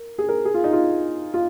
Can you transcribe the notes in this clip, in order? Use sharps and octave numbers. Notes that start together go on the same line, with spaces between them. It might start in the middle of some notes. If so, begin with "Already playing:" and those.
Already playing: A#4
G#4
A#4
G#4
F4
D#4
F4
F4